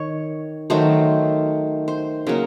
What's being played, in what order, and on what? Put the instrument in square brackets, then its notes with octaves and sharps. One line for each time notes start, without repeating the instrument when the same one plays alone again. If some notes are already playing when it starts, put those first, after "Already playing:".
Already playing: [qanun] D#3 C#5
D#3 F#3 A3 C5
C5
C#3 F#3 A#3 A#4